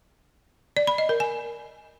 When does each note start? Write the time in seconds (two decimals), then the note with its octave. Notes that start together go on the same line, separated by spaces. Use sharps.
0.77 D5
0.87 B5
0.98 D#5
1.09 A#4
1.20 G#5